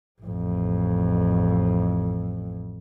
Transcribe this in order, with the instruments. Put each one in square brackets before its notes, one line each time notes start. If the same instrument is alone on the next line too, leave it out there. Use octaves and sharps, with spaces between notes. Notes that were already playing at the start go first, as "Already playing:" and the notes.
[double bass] A1 F2